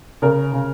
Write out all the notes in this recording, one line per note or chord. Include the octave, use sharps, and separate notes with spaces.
C#3 A#4
C#3